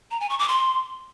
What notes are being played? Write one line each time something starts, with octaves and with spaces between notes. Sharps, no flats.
A#5
G#5
C#6
D6
C6